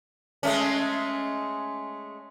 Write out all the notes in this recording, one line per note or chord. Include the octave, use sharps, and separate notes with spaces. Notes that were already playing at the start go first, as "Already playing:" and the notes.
G#3 A3 C#4